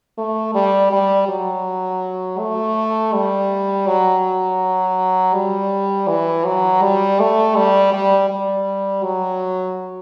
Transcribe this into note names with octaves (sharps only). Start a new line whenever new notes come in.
A3
G3
G3
F#3
A3
G3
F#3
G3
E3
F#3
G3
A3
G3
G3
G3
F#3